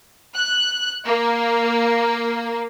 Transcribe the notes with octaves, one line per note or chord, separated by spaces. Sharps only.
F#6
A#3